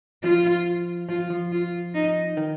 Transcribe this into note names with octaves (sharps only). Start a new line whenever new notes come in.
F3 F4
F3 F4
F3
F4
D#4
D#3